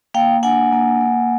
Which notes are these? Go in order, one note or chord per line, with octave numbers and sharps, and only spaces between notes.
A#3 F5 G5
D4 F#5 G#5
A#3
A#3